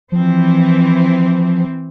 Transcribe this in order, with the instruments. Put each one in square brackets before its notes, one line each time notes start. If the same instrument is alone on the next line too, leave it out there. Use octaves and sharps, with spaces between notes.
[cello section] E3 C4 [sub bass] F3